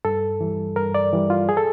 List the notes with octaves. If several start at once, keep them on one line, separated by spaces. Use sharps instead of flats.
G2 A4
E3 G3
G2 A#4
D5
E3 G3
F4
G#4
A4